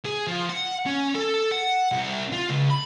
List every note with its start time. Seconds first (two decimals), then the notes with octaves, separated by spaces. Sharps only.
0.05 G#4
0.27 F3
0.49 F#5
0.87 C#4
1.15 A4
1.52 F#5
1.92 C2
2.32 F4
2.50 C#2
2.70 B5